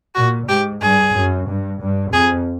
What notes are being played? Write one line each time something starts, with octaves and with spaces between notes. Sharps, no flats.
A#2 F#4
G#2 G4
G2 G#4
F#2
G2
G2
F2 G#4